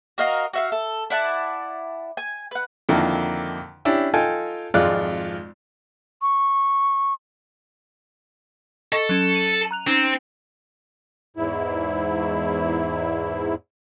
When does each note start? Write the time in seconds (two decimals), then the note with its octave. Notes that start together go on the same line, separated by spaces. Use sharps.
0.18 F#4 A#4 D#5 F5
0.53 F#4 E5 F5
0.72 A4
1.10 E4 D5 F#5 A5
2.17 G#5
2.51 B4 F#5
2.89 F2 D3 D#3 A#3 D4 E4
3.85 C#4 D4 E4 G4
4.14 D#4 F4 A4 G5 G#5
4.74 G#1 F2 G#3 F4 D5 F#6
6.22 C#6
8.92 A4 D#5 C#6
9.09 F#3 C#4
9.34 D#7 F#7
9.71 A#5 F#6 F7
9.87 C4 C#4 D#4 C#7
11.37 E2 G#2 E4